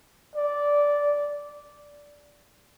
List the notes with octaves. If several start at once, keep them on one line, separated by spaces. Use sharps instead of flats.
D5